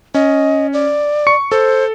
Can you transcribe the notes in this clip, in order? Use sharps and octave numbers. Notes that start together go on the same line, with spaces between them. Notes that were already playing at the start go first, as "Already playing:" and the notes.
C#4 D#5
D5
C#6 C#7
A4 C5